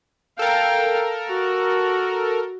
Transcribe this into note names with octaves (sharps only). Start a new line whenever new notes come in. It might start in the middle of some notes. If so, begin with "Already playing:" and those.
A4 A#4 F5 G5
F#4